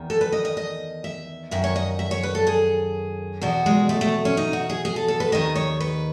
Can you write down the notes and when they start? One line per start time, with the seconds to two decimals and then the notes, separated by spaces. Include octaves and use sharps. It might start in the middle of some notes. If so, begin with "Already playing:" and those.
Already playing: E2 D#3
0.10 A4
0.21 B4
0.32 D#5
0.45 D#5
0.57 D#5
1.04 E5
1.51 F#2 D#3 E5
1.64 C#5
1.76 D#5
1.99 E5
2.11 C#5
2.23 B4
2.35 A4
2.47 G#4
3.41 E2 B2 F#4
3.66 G#3
3.89 A3
4.01 A3
4.25 C#4
4.37 D#4
4.53 F#4
4.70 G#4
4.85 G#4
4.96 A4
5.08 A4
5.20 B4
5.32 D#2 D#3 D#5
5.56 C#5
5.80 B4